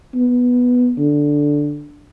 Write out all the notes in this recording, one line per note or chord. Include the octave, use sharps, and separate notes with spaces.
B3
D3